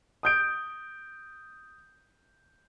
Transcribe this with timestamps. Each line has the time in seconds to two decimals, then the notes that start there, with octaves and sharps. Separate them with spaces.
0.23 D#6 G6 D7